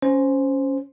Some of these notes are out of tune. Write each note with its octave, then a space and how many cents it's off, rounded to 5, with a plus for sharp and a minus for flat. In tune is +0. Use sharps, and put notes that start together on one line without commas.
C#4 +0 C5 +0